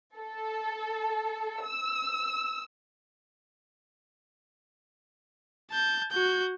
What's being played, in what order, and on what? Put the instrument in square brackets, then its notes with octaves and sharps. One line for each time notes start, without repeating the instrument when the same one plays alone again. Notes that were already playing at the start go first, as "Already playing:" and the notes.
[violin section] A4
E6
[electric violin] A5 G6
F#4 G6